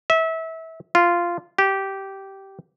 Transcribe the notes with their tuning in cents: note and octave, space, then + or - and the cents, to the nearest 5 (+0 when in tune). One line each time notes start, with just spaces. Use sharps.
E5 -25
F4 -10
G4 -15